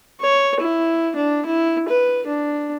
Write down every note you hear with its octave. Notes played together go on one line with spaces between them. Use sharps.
C#5
E4
D4
E4
B4
D4